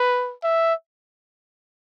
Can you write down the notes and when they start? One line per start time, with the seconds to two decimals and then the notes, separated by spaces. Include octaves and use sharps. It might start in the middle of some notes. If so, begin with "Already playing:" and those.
Already playing: B4
0.43 E5